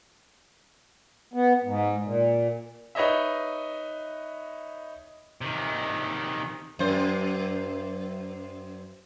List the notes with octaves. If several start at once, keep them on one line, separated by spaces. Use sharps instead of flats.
B3
G#2
A#2
D#4 B4 C#5 D#5 E5
C3 D#3
F#2 C5